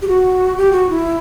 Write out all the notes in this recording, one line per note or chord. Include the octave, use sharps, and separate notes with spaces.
G4
F#4
G4
F#4
E4